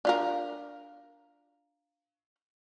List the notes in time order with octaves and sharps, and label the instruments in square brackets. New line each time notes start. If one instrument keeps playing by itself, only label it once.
[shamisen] D4 F4 A#4